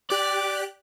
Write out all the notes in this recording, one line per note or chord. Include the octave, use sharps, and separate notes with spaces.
G4 D5 F#6